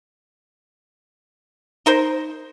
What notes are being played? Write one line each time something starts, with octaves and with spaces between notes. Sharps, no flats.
D#4 A#4 C5